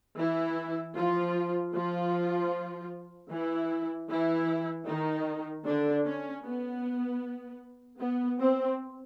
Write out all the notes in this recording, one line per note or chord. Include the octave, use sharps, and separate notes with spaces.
E3 E4
F3 F4
F3 F4
E3 E4
E3 E4
D#3 D#4
D3 D4
C#4
B3
B3
C4